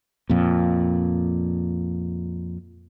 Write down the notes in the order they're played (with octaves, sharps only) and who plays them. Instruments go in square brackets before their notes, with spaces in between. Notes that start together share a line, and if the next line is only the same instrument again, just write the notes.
[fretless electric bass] F2 A#2